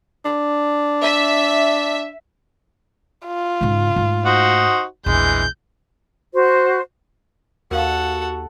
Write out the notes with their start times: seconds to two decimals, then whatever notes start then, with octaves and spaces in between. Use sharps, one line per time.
0.25 D4
1.01 E5
3.26 F4
3.61 G#2 C#3
3.96 G#2 A3
4.25 D#4 F#4 C5
5.06 A#1 E2 E3 G#3 G6
6.34 F#4 C5
7.71 D#2 F#4 A4 A#4 F5 F#5